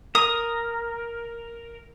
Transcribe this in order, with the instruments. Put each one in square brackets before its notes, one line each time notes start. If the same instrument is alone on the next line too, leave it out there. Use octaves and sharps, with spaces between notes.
[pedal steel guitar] A#4 [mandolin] D#6